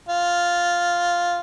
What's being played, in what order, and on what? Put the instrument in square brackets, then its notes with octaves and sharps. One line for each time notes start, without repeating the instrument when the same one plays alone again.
[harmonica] F4